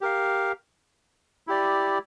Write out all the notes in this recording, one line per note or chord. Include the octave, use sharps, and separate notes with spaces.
G4 A#4 F5
E4 G4 D5